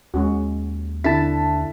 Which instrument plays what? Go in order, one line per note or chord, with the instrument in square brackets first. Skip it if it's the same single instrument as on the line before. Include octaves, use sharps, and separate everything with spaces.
[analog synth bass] D#2 [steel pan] G#3 C#4 F#4
[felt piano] D3 B6 [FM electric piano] E4 A5